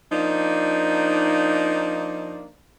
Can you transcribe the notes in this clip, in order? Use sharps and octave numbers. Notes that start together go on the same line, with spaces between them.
F3 A#3 D4 D#4